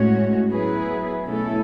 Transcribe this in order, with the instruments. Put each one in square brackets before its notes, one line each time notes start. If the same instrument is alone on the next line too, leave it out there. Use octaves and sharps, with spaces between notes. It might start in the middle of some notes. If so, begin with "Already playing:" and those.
Already playing: [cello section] A2 G#3 C#4 F#4 C#5
F#3 B3 E4 G#4 B4
B2 A3 C#4 E4 A4